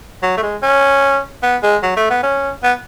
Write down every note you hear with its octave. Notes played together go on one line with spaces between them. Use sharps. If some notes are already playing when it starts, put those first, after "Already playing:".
F#3
A3
G#3
C#4
B3
G#3
F#3
A3
B3
C#4
B3